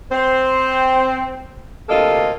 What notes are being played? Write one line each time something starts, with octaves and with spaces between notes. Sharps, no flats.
C4 C5
D2 C3 A#3 F4 A4 D#5